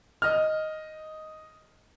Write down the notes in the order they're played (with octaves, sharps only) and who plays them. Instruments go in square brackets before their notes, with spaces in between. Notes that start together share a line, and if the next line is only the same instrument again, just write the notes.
[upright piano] D#5 F6